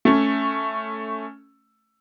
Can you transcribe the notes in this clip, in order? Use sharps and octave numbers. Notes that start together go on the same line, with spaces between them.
A3 C#4